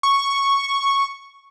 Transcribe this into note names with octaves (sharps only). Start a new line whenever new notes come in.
C#6